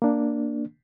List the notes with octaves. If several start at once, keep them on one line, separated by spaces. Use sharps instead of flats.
A#3 D4